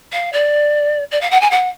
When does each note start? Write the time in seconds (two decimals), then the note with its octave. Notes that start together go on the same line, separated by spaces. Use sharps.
0.13 F5
0.32 D5
1.11 D5
1.21 F5
1.31 F#5
1.41 G#5
1.51 F#5